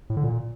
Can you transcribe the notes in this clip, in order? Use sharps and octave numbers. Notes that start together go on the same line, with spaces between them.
A2
D3
A#2